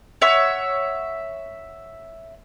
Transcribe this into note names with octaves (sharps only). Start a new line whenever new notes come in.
C#5 E5 F#5 C#6